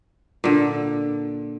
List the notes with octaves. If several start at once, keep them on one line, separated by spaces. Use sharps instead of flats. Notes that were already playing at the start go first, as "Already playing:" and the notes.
A#2 D3